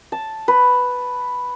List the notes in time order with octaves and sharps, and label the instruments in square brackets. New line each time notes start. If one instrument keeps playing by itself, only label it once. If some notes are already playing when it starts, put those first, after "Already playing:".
[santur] A5
B4